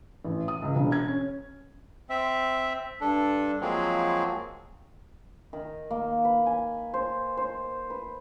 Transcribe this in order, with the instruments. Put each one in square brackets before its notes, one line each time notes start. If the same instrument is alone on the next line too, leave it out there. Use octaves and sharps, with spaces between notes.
[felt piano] A1
D#6
C#2
E1
G#6
C#4
[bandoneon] C4 E5
G2 D4 A4
F3 F#3 G#3 A#3 C4
[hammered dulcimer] D#3
A#3
B4
G#5
C5
C5
B4